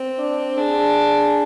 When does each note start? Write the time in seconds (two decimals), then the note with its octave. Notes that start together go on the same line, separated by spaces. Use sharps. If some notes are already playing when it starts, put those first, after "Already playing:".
Already playing: C4
0.18 D4
0.58 D4 G#4